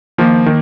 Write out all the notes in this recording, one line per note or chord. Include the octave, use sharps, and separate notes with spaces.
D#3 F3 A#3 F4
D#3